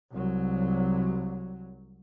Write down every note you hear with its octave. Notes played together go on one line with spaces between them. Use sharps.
C2 F#3